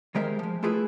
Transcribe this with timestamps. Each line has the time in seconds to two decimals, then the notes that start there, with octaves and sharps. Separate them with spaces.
0.15 D#3 G3 G#3 A#4 C5 E5
0.39 F3 G#3
0.63 A3 E4 F4 G#4 B4